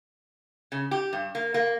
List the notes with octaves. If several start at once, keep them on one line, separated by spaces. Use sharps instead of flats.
C#3
G4
G2
A#3
A#3